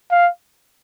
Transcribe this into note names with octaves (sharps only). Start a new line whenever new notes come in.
F5